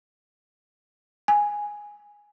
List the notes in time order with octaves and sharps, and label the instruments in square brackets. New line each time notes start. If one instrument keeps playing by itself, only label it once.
[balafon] G#5